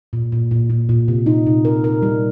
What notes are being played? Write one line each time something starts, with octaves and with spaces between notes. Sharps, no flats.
A#2
A#2
A#2
A#2
A#2
C3
D#4
C3
A#4
A#4
G3